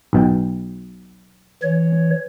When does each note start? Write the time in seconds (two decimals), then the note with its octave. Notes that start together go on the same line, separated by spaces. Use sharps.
0.13 B1 B2 G5
1.62 E3 C#5